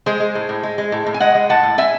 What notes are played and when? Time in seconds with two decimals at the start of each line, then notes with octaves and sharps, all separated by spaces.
0.06 G#3 G#4 C5
0.20 G#3
0.35 A2
0.49 A2
0.63 G#3
0.78 G#3
0.92 A2
1.06 A2
1.14 G#5
1.20 G#3 D#5 F#5
1.35 G#3
1.49 A2 F#5 A5
1.63 A2
1.78 G#3 E5 G#5